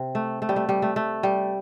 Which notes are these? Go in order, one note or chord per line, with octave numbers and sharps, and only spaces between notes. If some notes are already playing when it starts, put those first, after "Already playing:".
Already playing: C3
A3
A3
G3
A3
G3
A3
A3
G3